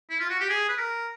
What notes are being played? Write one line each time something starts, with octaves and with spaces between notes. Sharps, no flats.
E4
F4
F#4
G4
G#4
B4
A#4